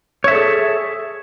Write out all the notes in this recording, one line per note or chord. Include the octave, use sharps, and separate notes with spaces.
G#4 A4 C#5 E5